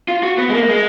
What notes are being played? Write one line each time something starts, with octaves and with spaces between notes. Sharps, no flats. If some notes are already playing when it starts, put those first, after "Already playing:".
F4
F#4
B3
G#3
A#3
G#3